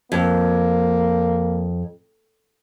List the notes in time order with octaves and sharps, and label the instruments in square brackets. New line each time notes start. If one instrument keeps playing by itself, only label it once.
[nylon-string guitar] F2 [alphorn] A#3